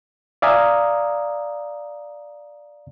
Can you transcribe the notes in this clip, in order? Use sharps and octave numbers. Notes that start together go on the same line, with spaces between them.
D5 E5 F5 G#5 A#5 D#6